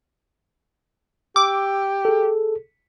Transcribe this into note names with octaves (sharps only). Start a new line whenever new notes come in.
G4 D6 E6
G#4 A4